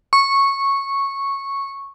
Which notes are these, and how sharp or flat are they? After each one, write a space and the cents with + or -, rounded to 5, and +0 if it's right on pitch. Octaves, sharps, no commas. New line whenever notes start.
C#6 -10